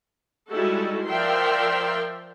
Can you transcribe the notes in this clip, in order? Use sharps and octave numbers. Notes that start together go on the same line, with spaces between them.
G3 G#3 D#4 E4 F#4 A4
F3 A#4 D5 E5 G5 C6